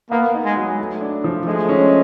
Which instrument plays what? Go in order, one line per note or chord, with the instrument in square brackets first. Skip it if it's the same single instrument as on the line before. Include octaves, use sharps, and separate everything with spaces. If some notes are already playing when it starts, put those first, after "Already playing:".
[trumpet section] A#3 [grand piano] B3
[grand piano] D#4
[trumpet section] G#3
[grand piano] F#3
A3
D4
F3
[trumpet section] G#3 [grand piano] A3
[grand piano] C#4